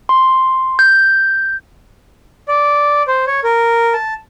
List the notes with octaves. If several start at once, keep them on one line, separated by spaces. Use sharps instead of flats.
C6
G6
D5
C5
C#5
A#4
A5